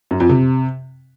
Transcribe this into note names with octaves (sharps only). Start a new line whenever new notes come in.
F#2
F2
C3